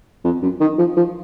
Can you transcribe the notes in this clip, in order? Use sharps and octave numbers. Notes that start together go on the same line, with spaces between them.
F2
F#2
D#3
F3
F3